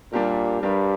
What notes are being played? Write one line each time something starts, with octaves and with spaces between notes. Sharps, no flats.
A#2 G3 D4 G4 A#4
G2 G3 D4 G4 A#4